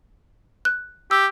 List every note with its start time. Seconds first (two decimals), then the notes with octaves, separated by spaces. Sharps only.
0.65 F#6
1.11 G4 E6